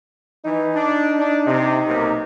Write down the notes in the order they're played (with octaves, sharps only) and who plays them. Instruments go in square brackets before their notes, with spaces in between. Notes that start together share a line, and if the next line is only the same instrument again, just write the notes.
[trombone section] E3 [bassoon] D#4
[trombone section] D4
D4
[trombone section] C3 [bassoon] D#4
[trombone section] B1 C3 A#3